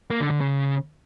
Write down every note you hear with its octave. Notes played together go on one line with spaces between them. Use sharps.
A#3
D3
D3
C#3